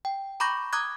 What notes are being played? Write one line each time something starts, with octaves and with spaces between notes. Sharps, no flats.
G5
A#5 B5 C#6 D6 G6 A#6
A#5 D6 D#6 F#6 G#6